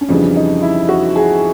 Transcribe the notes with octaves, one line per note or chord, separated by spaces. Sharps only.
C#4
F2 C#3 E3 G3 D4
D#4
E4
F#4
G#4